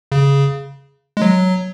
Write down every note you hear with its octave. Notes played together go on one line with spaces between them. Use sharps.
C#3
G#3
F#3